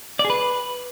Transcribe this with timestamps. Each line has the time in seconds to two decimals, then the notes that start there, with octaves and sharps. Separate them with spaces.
0.19 D5
0.25 G#4
0.30 B4